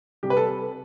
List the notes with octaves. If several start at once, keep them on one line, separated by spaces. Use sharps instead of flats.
C3 G3 G4
B4
A4